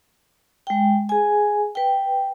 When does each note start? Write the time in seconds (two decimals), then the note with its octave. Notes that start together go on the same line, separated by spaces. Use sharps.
0.67 G#3 G5
1.09 G#4 G#5
1.75 B4 G5